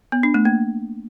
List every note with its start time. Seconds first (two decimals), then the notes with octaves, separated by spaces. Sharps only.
0.12 B3
0.23 D4
0.34 A3
0.45 A#3